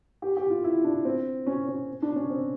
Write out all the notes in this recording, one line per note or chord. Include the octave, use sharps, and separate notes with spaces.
G4
G4
F4
E4
D4
C4
C#4
C#4
D4
C#4
C4